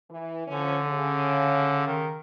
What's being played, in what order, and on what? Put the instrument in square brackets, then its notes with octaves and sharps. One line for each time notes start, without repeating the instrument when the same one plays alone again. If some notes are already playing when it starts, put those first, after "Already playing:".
[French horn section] E3
[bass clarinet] D3 [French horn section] F3 C#4
[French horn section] C#3
[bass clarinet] D#3